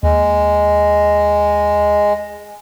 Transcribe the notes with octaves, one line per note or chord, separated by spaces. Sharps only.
D#2 G#3